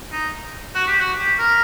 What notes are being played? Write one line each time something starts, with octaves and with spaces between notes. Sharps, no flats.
D#4
F#4
G4
F#4
G4
A#4